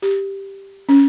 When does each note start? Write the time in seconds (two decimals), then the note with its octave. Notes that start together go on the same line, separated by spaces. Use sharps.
0.02 G4
0.89 C#4